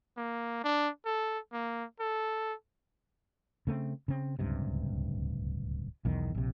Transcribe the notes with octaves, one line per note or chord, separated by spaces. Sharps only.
A#3
D4
A4
A#3
A4
C#3 A3 A#3 C4
C#3 C4
D1 C#2 G2 C3
B1 E2 D#3
A#1 C3